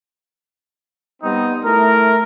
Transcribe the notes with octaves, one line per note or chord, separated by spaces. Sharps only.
G3 B3 C4 D#4
A3 E4 A#4